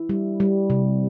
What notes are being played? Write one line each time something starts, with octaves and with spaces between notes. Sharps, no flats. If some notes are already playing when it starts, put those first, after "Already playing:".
Already playing: E4
G3
G3
C3